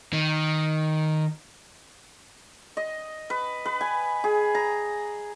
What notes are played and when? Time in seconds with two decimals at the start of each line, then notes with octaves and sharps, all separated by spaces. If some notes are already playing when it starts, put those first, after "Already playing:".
0.13 D#3
2.77 D#5
3.30 B4
3.66 B4
3.81 G#5
4.24 G#4
4.55 A#5